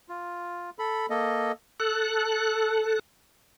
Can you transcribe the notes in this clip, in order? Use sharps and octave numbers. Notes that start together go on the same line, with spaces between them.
F4
A4 B5
A#3 A4 D#5
A4 F#6